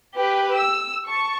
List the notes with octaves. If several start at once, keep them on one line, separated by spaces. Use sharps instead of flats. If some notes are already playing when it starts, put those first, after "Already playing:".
G4 B4
E6
A5 C#6